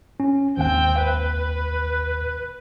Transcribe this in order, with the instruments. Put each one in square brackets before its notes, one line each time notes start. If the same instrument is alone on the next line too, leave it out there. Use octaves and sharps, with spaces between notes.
[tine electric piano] C#4
[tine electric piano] G#1 D#2 [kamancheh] C4 G5
[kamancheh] B4